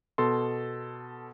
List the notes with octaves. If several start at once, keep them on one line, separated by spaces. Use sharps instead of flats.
B2 A4 C6